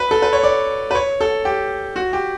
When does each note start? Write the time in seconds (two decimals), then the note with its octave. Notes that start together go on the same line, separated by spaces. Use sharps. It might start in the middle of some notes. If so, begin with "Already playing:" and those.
Already playing: B4
0.11 A4
0.22 B4
0.33 C#5
0.43 D5
0.91 B4
0.95 C#5
1.21 A4
1.45 G4
1.96 F#4
2.13 G4